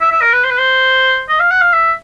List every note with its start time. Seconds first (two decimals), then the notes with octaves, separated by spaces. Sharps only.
0.01 E5
0.12 E5
0.22 A#4
0.33 B4
0.44 C5
0.51 B4
0.59 C5
1.29 D#5
1.40 F5
1.51 F#5
1.62 F5
1.73 E5